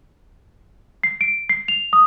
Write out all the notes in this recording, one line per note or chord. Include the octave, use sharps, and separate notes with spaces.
C7
D7
C7
F7
D#6